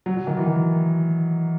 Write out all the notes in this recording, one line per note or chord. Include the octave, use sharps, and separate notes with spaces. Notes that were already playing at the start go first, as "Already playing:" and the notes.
F#3
F#3
D#3
E3
D#3